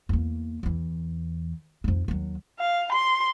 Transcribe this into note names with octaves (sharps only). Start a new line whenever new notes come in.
E2 A#3
E2 E3
F2 D#4
D#2 F#3
F5
C6